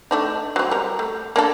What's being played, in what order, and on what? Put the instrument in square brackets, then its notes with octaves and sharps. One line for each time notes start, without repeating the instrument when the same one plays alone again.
[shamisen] A3 D4 D#4
F#3 C4
G3 A#4
A3
A#3 D4 A4